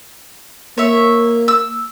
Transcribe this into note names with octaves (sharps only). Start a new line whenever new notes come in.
A#3 C#5 E5
E6